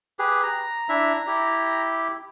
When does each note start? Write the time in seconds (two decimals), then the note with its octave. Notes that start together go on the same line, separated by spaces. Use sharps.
0.19 G4 G#4 B4
0.43 A#5
0.89 D4 E4 E5
1.27 E4 G4